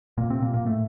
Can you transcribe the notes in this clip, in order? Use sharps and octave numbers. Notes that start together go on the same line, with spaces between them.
A#2 A#3
C3 C4
A#2 A#3
A#2 A#3
A2 A3